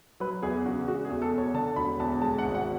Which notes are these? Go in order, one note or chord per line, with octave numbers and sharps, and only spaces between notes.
F#3 B4
E2 G#4
C#3 F#4
G#3 F#4
G#4
E2
A4
B2
C#5
D3 A5
E1 B5
E2 A5
G#3 A5
F#5
G#1
F#5